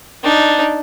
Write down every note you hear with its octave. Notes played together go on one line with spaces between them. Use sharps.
D4 D#4